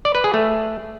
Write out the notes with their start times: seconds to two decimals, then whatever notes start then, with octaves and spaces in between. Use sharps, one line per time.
0.05 D5
0.15 B4
0.24 G#4
0.34 A3